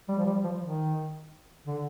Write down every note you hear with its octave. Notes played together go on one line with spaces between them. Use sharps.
G3
F3
G3
F3
D#3
D3